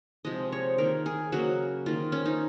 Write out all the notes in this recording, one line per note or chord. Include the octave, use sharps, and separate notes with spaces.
C3 F3 G#3 D#5
C#5
D#3 A#3 A#4
G#4
C#3 F#3 A#3 F#4
D#3 A#3 F4
C#4
D#4